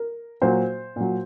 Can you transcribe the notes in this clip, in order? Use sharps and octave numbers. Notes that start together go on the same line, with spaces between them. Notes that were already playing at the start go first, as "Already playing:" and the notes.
Already playing: A#4
A#2 F#3 C5
A#2 F#3